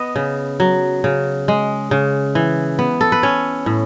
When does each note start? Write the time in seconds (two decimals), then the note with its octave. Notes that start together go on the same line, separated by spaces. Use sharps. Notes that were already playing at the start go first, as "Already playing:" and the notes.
Already playing: B3 D#5
0.16 C#3
0.60 F#3
1.04 C#3
1.48 G#3
1.91 C#3
2.35 E3
2.79 B3
3.01 A4
3.12 B4
3.23 C#4 C#5
3.66 A2